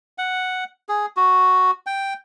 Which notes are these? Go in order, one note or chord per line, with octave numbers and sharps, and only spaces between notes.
F#5
G#4
F#4
G5